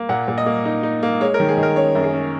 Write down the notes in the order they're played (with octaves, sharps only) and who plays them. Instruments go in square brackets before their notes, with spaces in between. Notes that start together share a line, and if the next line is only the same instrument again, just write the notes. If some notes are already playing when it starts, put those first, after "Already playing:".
Already playing: [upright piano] A#3
A#2 F#5
A#2
D#5
A#3
D#4
D#4
A#3
G#3 C#5
A#4
D#3
G#4
D#3
A#4
C#4 C#5
F#2
G#4
C#4